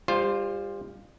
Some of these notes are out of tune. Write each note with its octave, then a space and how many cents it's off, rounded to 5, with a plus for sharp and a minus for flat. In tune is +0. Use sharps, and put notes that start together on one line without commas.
G3 +30 F4 +0 C5 +0